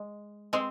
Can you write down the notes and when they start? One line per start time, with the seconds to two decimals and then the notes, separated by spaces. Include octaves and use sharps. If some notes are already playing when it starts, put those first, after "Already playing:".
Already playing: G#3
0.53 G#3 C4